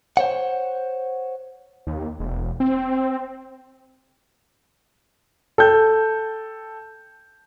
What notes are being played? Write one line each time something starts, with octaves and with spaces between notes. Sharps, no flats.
C5 C#5 F#5
D#2
E1
C4
A4 G5 G6